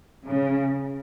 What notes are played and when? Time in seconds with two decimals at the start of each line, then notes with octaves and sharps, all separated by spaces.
0.24 C#3